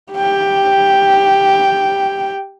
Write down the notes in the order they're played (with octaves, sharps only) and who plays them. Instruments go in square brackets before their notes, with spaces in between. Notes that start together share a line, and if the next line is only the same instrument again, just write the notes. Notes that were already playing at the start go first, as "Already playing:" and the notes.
[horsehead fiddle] G4 G5